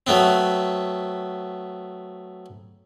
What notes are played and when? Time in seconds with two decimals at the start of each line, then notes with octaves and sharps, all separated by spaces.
0.07 F#3 A3 B3 C4